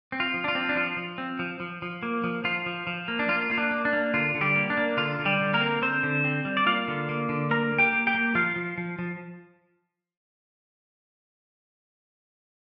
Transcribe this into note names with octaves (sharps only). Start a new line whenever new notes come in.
C4
F4
F3
D4
F4
C4
D4
F3 F4
F3
C4
F3
F3
F3
A#3
F3
F3 F4
F3
F3
A#3
D4
A#3 F4
A#3 F4
D4
A#3
D4
A#3
D3 F4
D3
G3 G4
A#3
D4
A#3
D3 F4
D3
G3 G4
D3
A#3 A#4
C4
D3 C4 C5
D3
C4
G3
D5
A#3 F4 F5
D3
A#3
D3
A#3 A#4 A#5
A#3
G4 G5
A#3
G4 G5
A#3
F3 F4 F5
F3
F3
F3